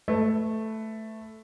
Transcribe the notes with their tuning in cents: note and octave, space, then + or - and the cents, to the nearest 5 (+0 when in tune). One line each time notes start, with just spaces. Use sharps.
A3 +0 B4 +15